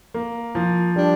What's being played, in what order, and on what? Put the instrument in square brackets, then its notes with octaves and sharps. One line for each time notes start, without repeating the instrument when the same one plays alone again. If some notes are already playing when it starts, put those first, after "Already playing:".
[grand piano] A#3
F3
[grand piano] G3 [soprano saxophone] D4